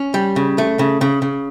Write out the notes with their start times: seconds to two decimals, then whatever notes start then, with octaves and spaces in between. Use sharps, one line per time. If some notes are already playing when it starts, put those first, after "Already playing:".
Already playing: C#4
0.14 G3
0.36 C#3
0.58 A3
0.79 C#3
1.01 C#3
1.22 C#3